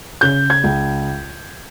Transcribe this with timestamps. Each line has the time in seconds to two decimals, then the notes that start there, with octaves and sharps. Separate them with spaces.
0.21 C#3 G6
0.50 G#6
0.64 C#2